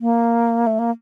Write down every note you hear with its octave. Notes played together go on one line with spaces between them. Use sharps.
A#3
A3
A#3